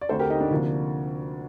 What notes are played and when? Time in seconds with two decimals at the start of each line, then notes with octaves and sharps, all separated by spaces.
0.01 D5
0.09 D2 D3 A3 C4 A4 C5
0.19 G4 A#4
0.30 D#4 G4
0.41 D4
0.51 D2 C3 F3 A#3